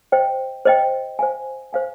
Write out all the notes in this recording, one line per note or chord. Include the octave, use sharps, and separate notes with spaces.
C5 D#5 G5
C5 D#5 G5
C5 F5 G#5
C5 F5 G#5